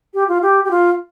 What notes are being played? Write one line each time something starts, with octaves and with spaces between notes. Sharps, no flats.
G4
F4
G4
G4
F4